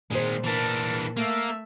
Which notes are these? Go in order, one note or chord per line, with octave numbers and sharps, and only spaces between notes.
A#2 D#3 G#3 C5
E3 D4 A#4 A5
A3 A#3 E5